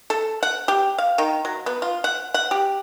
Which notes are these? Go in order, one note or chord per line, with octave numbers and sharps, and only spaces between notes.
A4
F#5
G4
F5
D#3
F#3
B3
F4
F#5
F#5
G4